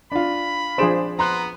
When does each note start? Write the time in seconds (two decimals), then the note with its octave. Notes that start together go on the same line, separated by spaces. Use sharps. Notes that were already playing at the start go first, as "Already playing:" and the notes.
0.12 D4 F4 B5
0.78 F3 D4 G#4 C5 D7 E7
1.19 B3 A#5 C6 F#6